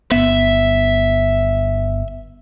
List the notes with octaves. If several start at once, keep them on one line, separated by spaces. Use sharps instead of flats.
G1 B3 E5